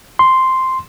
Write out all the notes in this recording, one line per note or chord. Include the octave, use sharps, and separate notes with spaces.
C6